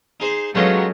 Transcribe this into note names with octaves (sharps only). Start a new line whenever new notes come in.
D#4 G#4 C5
F#3 G#3 A3 B3 C#4 F4 D#5